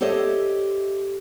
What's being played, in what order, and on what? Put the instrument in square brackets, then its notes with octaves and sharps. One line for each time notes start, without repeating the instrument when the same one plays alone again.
[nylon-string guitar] G4 A4 C5 C#5 D#5 E5